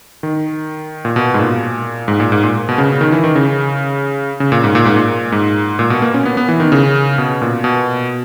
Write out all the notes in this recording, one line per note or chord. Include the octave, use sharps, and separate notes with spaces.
D#3
A#2
B2
G#2
A#2
G#2
A#2
G#2
A#2
B2
C#3
D#3
E3
D#3
C#3
C#3
A#2
G#2
A#2
G#2
A#2
G#2
A#2
B2
A#3
C#4
B3
B3
E3
D#3
C#3
B2
A#2
B2